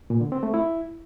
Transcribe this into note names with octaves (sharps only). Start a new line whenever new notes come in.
A#2
D3
C4
A3
E4